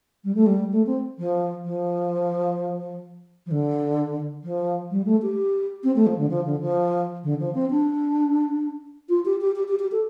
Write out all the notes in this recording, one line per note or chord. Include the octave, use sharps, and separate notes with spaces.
G3
A3
G3
A3
C4
F3
F3
F3
D3
F3
G3
A3
G4
C4
A3
F3
D3
F3
D3
F3
D3
F3
C4
D4
F4
G4
G4
G4
G4
G4
A4